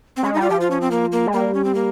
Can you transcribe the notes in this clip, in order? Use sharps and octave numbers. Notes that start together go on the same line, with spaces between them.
C4
G#3 C#4
G3 D#4
F4
F3 G4
F4
C#4
C4
A#3
A#3
G#3
G3 A#3
C#4
C4
A#3